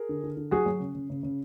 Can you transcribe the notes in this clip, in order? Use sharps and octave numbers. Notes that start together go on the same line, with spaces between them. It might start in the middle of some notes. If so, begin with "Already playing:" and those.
Already playing: G#4 A#4
D3
D3
D3
F#3 F#4 G#4
F#3
C#3
C#3
C#3
C#3